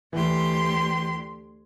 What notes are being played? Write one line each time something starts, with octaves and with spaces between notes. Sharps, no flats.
D2 E3 G4 C6